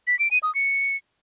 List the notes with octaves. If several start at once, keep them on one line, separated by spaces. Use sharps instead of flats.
B6
D7
D#7
D#6
C#7